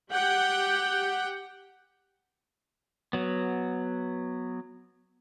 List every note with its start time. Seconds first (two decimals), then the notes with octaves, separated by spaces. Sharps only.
0.11 G4 F#5 G5
3.13 F#3 B3